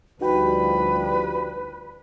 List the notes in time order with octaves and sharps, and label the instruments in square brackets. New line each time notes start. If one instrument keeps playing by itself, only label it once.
[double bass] D2 [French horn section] F3 G3 [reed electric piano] D#4 F#4 G5 [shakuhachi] B4